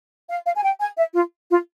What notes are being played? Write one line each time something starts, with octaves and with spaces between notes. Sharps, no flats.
F5
F5
G#5
G5
G#5
E5
F4
F4